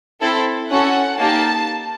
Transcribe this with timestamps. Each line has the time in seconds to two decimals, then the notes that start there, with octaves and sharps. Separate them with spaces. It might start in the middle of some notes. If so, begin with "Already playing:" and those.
0.22 C4 E4 A4
0.70 C#4 F#4 A4 F#5
1.19 A#3 D#4 G4 A5